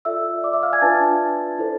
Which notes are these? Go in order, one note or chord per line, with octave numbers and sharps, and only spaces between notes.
F4 A4 D5 E5 E6
D5 D6
E5 E6
F5 F6
G#5 G#6
D4 F4 B4 D5 A5 A6
E4 A4 C5